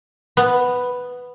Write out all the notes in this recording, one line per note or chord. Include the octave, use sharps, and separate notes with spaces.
B3